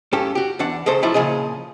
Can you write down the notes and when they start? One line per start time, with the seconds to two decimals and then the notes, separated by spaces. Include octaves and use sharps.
0.13 G2 C#4 G4 A4
0.35 F#4 G4
0.59 E2 E3 D4 F#5
0.86 C#2 C#3 A4 C5
1.03 F3 F#3 A3 E4
1.14 A#2 C#3 F3 G#4 D#5